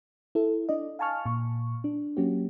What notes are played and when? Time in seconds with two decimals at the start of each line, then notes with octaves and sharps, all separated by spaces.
0.35 E4 A4
0.69 D4 D5 D#5
0.99 F5 G#5 A5 C#6 F6
1.26 A#2 C#6
1.84 D4
2.17 F#3 A#3 C#4 F#4 G4